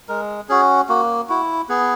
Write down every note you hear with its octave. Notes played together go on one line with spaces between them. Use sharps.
G#3 A#4
C#4 F#4 G#4
A#3 F#4
E4 F#4
B3 G#4